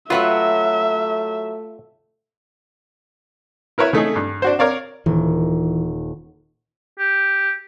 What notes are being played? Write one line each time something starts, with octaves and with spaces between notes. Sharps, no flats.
F#3 A3 F4 F#4 B4 C#5 E5
E4 A#4 B4 C#5 E5
C#3 A3 D#4 G#4
G2
D4 F#4 C5
A#4 C#5 D5 F5
D#1 E3
G4